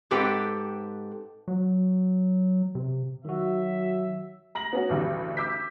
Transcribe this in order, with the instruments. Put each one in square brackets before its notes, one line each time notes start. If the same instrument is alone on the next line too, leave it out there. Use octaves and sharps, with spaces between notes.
[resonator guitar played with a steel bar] G#2 C4 G4 A4 B4 G5
[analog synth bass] F#3
C3
[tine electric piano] D#3 F#4 [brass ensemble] F#3 E5
[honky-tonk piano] A#5 A#6 F#7
B3 C#4 F#4
A1 D2 G3
D6 E6 G6 B6